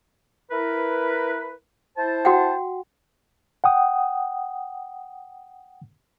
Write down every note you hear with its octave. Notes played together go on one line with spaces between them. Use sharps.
E4 A#4 B4
E4 C5 A5
F#4 F#5 G5
F#5 G5 D#6